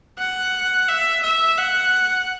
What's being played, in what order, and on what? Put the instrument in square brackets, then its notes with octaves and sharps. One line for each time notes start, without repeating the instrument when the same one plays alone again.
[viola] F#5
E5
E5
F#5